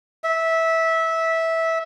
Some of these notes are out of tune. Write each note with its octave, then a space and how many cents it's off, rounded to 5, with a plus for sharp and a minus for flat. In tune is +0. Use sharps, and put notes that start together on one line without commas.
E5 -15